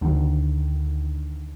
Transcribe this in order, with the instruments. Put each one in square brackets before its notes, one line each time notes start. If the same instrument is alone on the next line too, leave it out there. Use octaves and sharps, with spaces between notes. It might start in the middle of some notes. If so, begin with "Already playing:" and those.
[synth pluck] D2 D3 D#3